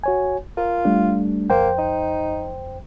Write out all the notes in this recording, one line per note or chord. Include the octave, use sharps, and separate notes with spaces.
F#4 C#5 G#5
F4 A#4
G3 A3 D4
F2 A#3 C5 G5
D#4